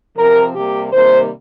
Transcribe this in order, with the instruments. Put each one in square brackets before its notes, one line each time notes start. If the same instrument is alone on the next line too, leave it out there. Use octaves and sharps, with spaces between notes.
[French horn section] C3 F3 C4 A#4
C3 G3 A#3 G4
C3 D#3 G3 A#3 C5